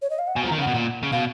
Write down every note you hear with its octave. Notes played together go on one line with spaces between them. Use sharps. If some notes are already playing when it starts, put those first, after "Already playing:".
C#5
D#5
F5
F#5
B2 G#5
F3
A#5
D#3
C#3 F#5
B2
A#2
C#3
B2 F5